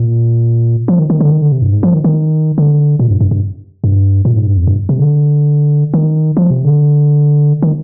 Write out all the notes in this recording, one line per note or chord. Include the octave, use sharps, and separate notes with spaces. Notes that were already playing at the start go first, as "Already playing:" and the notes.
Already playing: A#2
F3
D#3
D#3
D3
D#3
D3
C3
G2
G#2
F3
D#3
D#3
D3
A#2
G2
G2
G2
G2
A#2
G#2
G2
F2
G2
C3
D3
D#3
F3
C3
D3
D#3